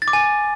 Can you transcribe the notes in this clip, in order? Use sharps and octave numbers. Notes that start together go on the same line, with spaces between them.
A6
D6
G#5